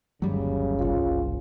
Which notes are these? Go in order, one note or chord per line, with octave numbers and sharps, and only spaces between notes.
G1 D#2 C#3 F#3 G3
F#1 C2 F4